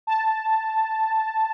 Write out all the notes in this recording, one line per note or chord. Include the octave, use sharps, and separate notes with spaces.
A5